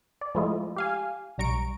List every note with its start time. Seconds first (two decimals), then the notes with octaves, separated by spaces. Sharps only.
0.21 D5
0.35 F3 G#3 A3 E4 F4 D#5
0.76 G4 F5 G#5
1.38 B1 G3 A#5 C#6 D7